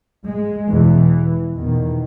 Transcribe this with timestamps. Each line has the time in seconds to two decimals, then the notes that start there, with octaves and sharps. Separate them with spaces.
0.26 G#3
0.69 E2 B2 E3
1.56 E2 B2 D#3